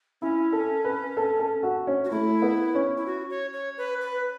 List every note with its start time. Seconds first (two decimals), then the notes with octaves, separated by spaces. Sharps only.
0.22 C#4 E4
0.53 A4
0.85 B4
1.17 A4
1.40 A4
1.63 F#4
1.87 C#4
2.05 F#4
2.11 A3 E4
2.42 B3
2.75 C#4
2.97 E4
3.06 F#4
3.30 C#5
3.53 C#5
3.77 B4
4.01 B4